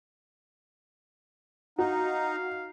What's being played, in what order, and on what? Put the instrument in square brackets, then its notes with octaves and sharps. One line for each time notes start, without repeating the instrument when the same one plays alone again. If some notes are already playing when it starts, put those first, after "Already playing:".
[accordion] D#4 [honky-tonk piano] F#4 [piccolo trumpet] F5